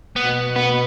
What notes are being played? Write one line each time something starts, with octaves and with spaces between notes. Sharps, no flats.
B2 B3
B3